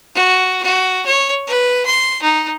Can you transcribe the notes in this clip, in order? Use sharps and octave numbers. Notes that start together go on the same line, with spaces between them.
F#4
F#4
C#5
B4
C6
D#4